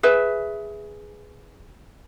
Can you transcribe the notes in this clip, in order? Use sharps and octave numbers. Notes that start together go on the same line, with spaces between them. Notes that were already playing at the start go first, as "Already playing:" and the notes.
G#4 B4 E5